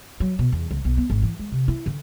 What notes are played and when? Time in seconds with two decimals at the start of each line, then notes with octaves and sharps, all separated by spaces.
0.20 F#3
0.39 B2
0.52 E2
0.71 C#2
0.85 B1
0.97 B3
1.10 G#1
1.22 E3
1.39 G#3
1.52 C3
1.68 E4
1.86 D3